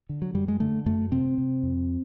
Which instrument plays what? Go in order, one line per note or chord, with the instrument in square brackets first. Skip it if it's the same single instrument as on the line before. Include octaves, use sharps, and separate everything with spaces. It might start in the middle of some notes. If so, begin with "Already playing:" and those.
[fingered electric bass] D3
F#3
F#2 G3
G#3
D3 A3
F#2 A3
C3 C4
C3
F2